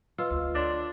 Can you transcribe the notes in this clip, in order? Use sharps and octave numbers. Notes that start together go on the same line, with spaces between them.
F4 B4 D#5 E6
D2
D4 C#5 D5 C6